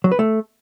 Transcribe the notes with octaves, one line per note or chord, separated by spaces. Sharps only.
F#3
B4
A3